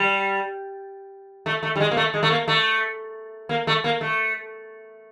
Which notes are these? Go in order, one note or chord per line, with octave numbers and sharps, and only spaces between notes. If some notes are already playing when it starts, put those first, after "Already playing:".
Already playing: G3
A3
A3
G3
G#3
A#3
A3
G#3
A3
A#3
A3
A#3
A3
A#3
A3